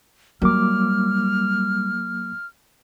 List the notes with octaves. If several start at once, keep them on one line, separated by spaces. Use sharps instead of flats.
F#3 G3 A#3 D6 F6